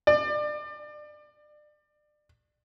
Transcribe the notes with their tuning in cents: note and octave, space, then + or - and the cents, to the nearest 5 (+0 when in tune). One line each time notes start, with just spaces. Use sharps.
D5 +30